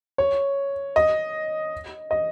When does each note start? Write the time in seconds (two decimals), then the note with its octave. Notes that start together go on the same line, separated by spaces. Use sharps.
0.18 C#5
0.96 D#5
2.11 D#5